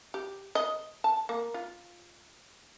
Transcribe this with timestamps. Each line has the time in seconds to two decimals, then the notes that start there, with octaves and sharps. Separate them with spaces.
0.14 G4
0.55 D#5
1.04 A5
1.29 A#3
1.54 F4